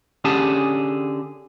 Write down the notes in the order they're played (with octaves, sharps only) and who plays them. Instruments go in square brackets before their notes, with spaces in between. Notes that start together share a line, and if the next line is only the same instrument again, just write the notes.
[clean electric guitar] D3 C#4 G4 G#4 F#5 A5